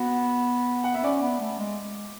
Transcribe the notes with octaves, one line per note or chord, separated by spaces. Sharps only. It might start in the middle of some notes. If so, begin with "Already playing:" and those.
Already playing: B3 F#4
F#5
B3 E5
C#4 D5
B3
A3
G#3